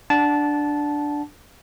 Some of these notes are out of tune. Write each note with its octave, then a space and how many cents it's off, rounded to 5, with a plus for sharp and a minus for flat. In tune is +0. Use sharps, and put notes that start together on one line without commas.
D4 +0 F#5 +0 A5 -15